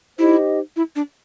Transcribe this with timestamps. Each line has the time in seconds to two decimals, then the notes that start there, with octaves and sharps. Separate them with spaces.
0.19 D#4 E4 G4 C5 D#5
0.76 E4
0.96 D4